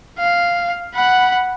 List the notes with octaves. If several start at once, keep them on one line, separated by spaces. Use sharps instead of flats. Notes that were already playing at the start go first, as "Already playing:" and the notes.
F5
F#5 B5